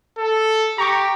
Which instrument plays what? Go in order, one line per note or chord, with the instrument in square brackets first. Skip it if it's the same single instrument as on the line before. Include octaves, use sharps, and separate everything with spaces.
[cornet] A4
[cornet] G4 [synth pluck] A#5 C#6 D6